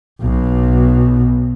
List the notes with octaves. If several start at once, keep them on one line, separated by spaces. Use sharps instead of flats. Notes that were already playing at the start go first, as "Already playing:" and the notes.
B1 B2